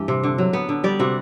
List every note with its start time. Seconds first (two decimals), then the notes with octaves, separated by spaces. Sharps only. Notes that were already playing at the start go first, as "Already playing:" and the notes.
Already playing: G2 E3 G4
0.08 C3
0.23 D3
0.38 F#3
0.53 B3
0.69 D3
0.84 G3 D5
0.99 C3 F#4